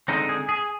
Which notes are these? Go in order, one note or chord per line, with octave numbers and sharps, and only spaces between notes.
D3 G#3 C4 D#4
G#4
G#4